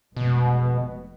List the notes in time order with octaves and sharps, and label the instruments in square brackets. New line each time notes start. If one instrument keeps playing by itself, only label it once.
[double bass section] F1 G#3 B3 [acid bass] B2